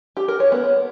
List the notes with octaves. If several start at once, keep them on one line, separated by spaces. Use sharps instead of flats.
G4
A#4
C#5
B3